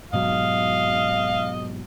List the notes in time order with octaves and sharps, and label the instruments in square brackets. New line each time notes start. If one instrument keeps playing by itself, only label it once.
[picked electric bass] G#2 B2 F#3 [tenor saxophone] D#5 [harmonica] F5